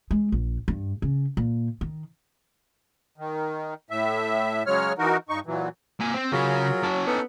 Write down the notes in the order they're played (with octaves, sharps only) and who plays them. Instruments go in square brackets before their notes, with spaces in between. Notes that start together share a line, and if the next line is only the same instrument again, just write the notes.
[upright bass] G#3
A#1
G2
C#3
A#2
D#3
[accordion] D#3
A2 E5
C#3 F#3 G#3 C#5 F6
E3 D#4 F#4 A#4
G2 D#4 C#6
A#2 E3 F#3
[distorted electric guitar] A#3 G#5
C4
[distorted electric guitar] C#3 [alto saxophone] F#3 [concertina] F4 G#4 A#4
[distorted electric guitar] C#4 A5
[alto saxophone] B3 [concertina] D#4 A4